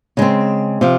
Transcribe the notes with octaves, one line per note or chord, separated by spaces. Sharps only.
C#3 G#3 C4
C3 F3